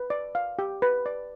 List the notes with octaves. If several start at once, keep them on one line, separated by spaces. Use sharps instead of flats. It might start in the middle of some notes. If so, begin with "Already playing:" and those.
Already playing: B4
D5
F5
G4
B4
D5